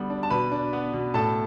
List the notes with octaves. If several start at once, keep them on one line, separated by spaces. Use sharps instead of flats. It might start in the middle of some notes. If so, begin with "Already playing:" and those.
Already playing: D3 G3 B3
D4
A5
B2 B4 B5
D4
B3
B2
A2 A4 A5